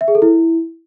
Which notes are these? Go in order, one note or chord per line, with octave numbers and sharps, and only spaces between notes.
E5
G#4
A4
E4